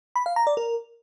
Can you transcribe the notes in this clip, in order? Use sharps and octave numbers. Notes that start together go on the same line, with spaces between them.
B5
F5
A#5
D5
A#4